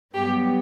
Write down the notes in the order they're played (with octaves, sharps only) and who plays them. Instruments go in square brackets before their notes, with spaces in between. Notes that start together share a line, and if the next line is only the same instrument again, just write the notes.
[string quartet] G2 F#3 B3 G4